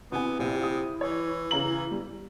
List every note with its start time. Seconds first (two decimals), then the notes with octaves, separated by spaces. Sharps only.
0.12 C3 B3 E4 G#5
0.39 A#1 C3
0.63 D#6
1.01 E3 C#5
1.51 C#3 A#5 F#7
1.91 G3